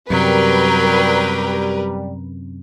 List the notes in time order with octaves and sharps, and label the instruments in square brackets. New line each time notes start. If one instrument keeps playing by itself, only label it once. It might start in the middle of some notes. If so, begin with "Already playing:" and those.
[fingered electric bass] F#2 C3 [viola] F#3 G5 [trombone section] G3 [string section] A#4 B4